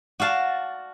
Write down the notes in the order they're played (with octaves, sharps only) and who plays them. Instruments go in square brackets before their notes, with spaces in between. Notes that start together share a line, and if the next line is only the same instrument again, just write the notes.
[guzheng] F#4 D5 F5 A5